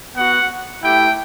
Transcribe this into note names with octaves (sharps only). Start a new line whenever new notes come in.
B3 F#4 F#5
A3 E4 G4 G5